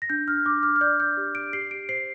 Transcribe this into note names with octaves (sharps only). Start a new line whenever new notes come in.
A#6
D4 G6
F6
D4 D6
F6
F6
D5 G6
G6
G4
D7
G4 C7
D7
C5 C7